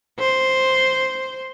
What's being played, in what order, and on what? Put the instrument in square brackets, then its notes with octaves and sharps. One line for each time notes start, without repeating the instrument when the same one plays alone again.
[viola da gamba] C5